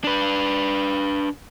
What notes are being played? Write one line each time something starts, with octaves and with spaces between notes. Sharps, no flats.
D4 B4